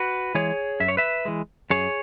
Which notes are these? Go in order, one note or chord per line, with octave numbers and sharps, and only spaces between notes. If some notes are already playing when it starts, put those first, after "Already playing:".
Already playing: F#4 B4
E3 G#3 G#4 C#5
F#2 E5
C#5
B4 E5
E3 G#3
F#2 G#4 C#5